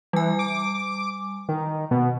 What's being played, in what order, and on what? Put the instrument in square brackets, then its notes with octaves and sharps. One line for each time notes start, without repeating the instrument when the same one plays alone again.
[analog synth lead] E3 [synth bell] G3 G#5
[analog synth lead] D6
D#3
B2